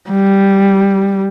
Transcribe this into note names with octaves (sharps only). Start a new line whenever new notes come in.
G3